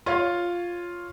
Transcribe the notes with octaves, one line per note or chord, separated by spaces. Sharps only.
F4 C#5 F5